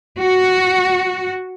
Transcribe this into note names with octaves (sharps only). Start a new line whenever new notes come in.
F#4